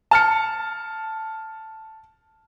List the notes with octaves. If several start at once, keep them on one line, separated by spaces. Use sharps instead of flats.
A5 F6 C#7